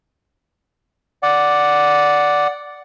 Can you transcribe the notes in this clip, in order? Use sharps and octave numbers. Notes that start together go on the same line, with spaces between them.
D5 F#5